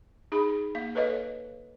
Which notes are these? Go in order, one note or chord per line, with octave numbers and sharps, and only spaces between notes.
D#4 G#4 B5
A#3 F5
A4 B4 C#5 D#5 F5